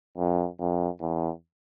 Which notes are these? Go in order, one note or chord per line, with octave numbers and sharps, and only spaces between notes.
F2
F2
E2